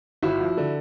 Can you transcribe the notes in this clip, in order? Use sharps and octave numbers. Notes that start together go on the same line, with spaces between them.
G1 E4 F#4
F3
D3